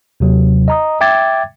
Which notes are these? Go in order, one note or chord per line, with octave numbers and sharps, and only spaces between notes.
D#2 C3 F#3
D#5 A#5 D#6
E5 G5 D6 G#6 A6